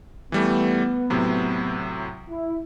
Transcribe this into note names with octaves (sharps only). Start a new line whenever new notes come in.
E3 G3 A3 B3
A2 C3 F#3
E4